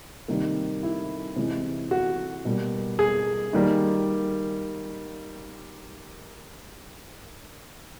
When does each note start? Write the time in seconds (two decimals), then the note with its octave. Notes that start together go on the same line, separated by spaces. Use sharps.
0.28 C3 D#3 G3 A#3
0.83 E4
1.36 C3 E3 G#3
1.91 F#4
2.45 B2 G3 A#3
2.99 G#4
3.53 D#3 G3 A#3